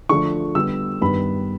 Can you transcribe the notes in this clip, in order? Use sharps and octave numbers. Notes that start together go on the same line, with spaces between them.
D3 F3 A3 D4 C#6
D3 G3 B3 E6
G2 D#3 G3 B3 B5